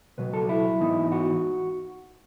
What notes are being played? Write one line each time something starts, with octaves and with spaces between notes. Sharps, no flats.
C#2 B2 F#3 B4
A4
E4
G#2 E3 B3 D#4
F#4